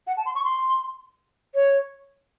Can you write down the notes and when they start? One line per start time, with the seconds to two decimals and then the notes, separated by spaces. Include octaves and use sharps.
0.07 F#5
0.17 A5
0.26 C6
0.35 C#6
0.45 C6
1.55 C#5